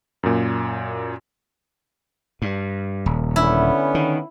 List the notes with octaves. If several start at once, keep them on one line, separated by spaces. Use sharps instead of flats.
F#2 A#2
G2
D#1
D3 B3 C#4 E4
D#3